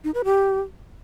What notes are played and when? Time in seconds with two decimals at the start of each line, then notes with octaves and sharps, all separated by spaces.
0.04 D#4
0.14 B4
0.24 G4